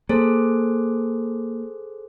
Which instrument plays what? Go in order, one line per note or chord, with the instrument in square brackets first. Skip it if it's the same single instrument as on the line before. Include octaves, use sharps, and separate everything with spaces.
[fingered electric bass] A#3 [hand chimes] G#4 A4 C5